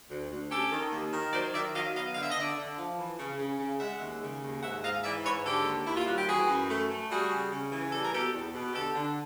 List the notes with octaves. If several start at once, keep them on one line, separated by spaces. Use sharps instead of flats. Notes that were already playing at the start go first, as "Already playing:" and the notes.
D2
D2
C#4 G4 A4
D#3
D#2
D#3
F#3 C5 D5
D#3 D5 E5
F#3 D#5 F5
B3 D#5 F5
D3 F5
E5
D#5
D3 D5 E5
D3
F3
E3
C#3
C#3
C#3
G#3 E5 F#5
D#2
C#3
D#2
G#2 E5 F#5
G#2 D#5 F5
E3 D5 E5
G#2 B4 C#5
D3 G4 A4
D#2
D#2 E4
F4
G3 F#4
G4
E3 F#4 G#4
F#2
A3
A3
G3 F#4 G#4
C#3
C#3
E3
G3 A4
A#4
B2 G4 A4
E2
B2
D3 G4 A4
D3